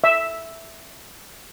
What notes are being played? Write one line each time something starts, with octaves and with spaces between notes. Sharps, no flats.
E5